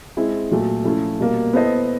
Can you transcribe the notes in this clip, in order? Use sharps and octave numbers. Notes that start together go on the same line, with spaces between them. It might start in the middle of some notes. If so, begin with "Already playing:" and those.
G#3 C4 E4
A#2 F#3 A3
F3 A3 C#4 E4
B2 G3 A#3
B3 E4 A4 C5 D#5